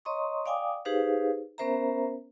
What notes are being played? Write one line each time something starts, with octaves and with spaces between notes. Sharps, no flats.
C#5 D#5 A#5 C6 C#6 D#6
D5 F5 G5 G#5 D6 D#6
D#4 G4 G#4 B4 C5 F5
B3 C#4 A#4 C5 E5 A#5